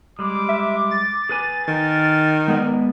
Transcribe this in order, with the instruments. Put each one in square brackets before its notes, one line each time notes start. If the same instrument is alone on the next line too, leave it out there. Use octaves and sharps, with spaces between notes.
[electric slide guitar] G3 G#3 [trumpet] D6
[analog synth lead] E5
A6
[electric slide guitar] G#4 B4 G#5
[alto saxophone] D#3 [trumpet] A#4
[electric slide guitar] G#3 G#4 D5 [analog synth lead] B3